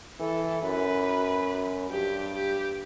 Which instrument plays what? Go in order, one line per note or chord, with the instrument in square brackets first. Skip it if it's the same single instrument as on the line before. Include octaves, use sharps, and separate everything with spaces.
[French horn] E3 [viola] A4
[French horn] F#2 [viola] B4
[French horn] G2 [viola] G4
[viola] G4